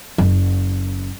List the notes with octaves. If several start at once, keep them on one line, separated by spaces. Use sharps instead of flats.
F#1